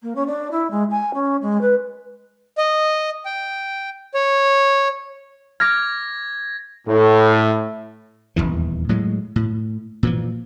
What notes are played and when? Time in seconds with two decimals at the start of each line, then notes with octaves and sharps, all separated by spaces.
0.02 A#3
0.15 C#4
0.27 D4
0.51 E4
0.71 G#3
0.90 G#5
1.14 C#4
1.42 G#3
1.61 B4
2.58 D#5
3.26 G5
4.14 C#5
5.60 D6 F6 G#6 A#6
6.88 A2
8.36 D#1 G#1 E2 E3
8.89 A2 F#3 G#3
9.36 A2
10.03 A#2 E3 F3